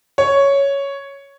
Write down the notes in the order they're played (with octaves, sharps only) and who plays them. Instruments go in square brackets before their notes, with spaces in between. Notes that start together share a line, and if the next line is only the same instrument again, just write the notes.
[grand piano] C#5